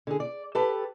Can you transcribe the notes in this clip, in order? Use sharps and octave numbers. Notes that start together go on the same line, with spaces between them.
D3 G#4
D5
G4 A4 B4 A5